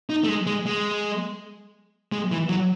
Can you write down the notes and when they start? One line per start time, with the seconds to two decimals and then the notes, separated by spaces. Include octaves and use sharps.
0.10 D#4
0.24 A3
0.29 G#3
0.47 G#3
0.66 G#3
2.12 G#3
2.31 E3
2.49 F#3